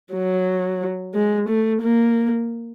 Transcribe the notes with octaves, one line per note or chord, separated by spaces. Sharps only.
F#3
G#3
A3
A#3